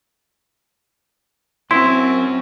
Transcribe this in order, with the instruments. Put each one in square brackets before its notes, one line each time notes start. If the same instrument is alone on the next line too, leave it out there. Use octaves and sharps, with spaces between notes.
[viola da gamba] C4 [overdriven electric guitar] C#4 F#4 [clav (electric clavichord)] E4 [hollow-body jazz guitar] C6